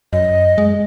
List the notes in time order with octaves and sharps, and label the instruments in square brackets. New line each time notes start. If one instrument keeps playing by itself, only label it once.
[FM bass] F#2 [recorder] D#5
[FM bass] G#3